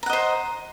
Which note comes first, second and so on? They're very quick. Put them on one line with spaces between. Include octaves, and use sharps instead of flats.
A#5 F#5 D#5 C5